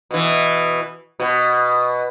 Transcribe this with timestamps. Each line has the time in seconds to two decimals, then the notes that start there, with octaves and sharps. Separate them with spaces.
0.11 B2 E3
1.20 B2